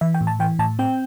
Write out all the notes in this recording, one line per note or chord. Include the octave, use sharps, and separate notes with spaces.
E3 E5
G5
A2
A5
E3 G5
A2 A5
C4 G5